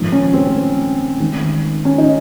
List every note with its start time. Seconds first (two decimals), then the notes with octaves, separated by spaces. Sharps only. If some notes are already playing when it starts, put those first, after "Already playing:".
Already playing: A#1 G#2 D#3
0.12 C#4
0.34 C4
1.20 G#1 G#2 D#3
1.85 C#4
1.98 D#4